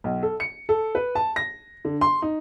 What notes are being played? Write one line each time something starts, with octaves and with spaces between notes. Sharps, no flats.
B1
A4
C#7
A4
B4
A5
A#6
D3
C6
D#4